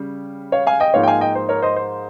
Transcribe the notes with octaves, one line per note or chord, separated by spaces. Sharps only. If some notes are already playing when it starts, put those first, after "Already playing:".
Already playing: C#3 G3
C#5 F5
F5 G#5
D#5 G5
G#2 F3 A#3 D#4 C#5 F5
G5
F5 G#5
D#5 G5
C5
A#4 C#5
C5 D#5
C5